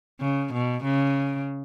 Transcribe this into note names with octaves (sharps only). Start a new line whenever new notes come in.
C#3
B2
C#3